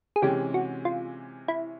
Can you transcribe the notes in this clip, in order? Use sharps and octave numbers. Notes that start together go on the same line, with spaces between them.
G#4
C3 E3 G#3 C#4 G4
F#4
F4
E4